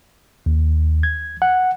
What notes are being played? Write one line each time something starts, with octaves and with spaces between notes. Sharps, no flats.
D#2
G#6
F#5